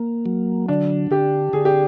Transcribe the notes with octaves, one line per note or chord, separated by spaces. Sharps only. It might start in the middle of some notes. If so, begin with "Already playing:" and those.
Already playing: A#3
F#3
D3 D4
D3 G4
D3 G#4
G4